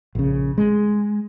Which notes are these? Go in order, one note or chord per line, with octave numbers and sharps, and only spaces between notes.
A#1 C#3
G#3